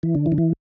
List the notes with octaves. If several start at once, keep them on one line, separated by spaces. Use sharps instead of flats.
E3
D3
E3
D3
E3